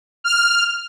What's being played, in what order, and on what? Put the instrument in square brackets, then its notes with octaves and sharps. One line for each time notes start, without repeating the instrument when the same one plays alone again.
[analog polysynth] F6